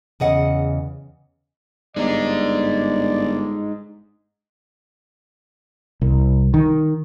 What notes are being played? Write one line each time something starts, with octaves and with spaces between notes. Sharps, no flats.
E2 C#3 D#5 F#5
G1 G#3 D#4 D5
C2
D#3